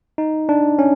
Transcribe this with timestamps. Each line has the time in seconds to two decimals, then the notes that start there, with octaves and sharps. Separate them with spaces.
0.18 D#4
0.49 D4
0.79 C#4